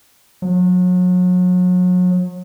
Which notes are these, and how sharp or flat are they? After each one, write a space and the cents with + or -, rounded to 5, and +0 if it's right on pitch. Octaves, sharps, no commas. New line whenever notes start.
F#3 -35